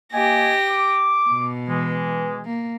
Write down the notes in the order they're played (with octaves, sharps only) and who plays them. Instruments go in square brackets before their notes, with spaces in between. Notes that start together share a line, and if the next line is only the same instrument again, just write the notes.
[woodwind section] A#3 D#5 G#5 [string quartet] G4 A#6
[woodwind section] D6
[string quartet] B2
[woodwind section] E3 G#3
[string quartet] A#3